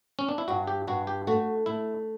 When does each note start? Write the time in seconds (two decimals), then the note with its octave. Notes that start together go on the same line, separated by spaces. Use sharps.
0.19 C#4
0.29 D4
0.38 E4
0.48 G2 F#4
0.67 G4
0.87 G2 F#4
1.07 G4
1.27 A3 F#4
1.66 A3 E4